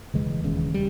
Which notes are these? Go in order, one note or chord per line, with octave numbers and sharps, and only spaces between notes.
E1 D#2 C#3 E3 G#3
E1 D#2 C#3
G3